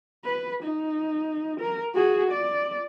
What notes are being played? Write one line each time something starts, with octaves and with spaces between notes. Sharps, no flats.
B4
D#4
A#4
F#4 G#4
D5